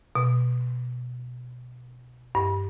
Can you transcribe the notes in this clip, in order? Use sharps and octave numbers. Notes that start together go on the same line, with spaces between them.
B2
G2